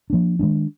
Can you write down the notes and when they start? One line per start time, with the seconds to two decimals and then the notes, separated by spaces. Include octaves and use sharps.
0.10 F3 A#3 D4
0.39 D#3 G#3 B3 D4